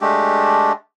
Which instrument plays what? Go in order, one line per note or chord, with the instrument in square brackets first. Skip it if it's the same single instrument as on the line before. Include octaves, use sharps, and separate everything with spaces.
[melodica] G#3 A3 D4 G4